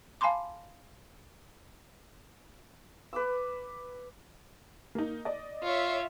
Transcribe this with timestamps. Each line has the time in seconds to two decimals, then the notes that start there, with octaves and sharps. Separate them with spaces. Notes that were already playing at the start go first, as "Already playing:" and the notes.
0.21 F5 G#5 A5 B5 C6 D6
3.13 B4 D6 E6
4.95 A#3 D#4
5.25 D5 D#5
5.63 F4 C#5 E5